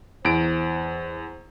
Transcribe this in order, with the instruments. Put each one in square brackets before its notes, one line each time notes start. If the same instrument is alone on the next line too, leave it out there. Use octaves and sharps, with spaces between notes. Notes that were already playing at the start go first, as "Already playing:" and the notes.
[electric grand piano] E2 D7 [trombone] C5